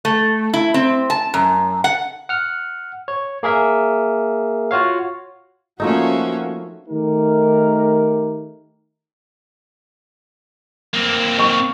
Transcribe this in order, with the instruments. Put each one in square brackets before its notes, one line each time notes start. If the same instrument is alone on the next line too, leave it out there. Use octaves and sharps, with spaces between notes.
[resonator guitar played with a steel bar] A3
E4
C4
A5
F#2
F#5
[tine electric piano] F#5 F6
C#5
A#3 G#4 A#4 E5
F4 F#4 C#5 F5
[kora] F3 A3 D#4 [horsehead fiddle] A#3 F#4 [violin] C#4 E5
[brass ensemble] D#3 A3 D#4 G4 A#4
[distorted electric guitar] A#3 C4
[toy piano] D#5 A#5 C#6